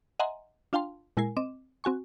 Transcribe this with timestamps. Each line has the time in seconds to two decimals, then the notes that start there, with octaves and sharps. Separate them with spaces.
0.19 D#5 E5 F#5 G#5 A#5 C6
0.73 D4 F4 F5 G5 A5 C6
1.17 A#2 G#3 E4 A#4 G#5 C7
1.37 C4 D#5 D6 E7
1.84 C4 F#4 G#5 C#6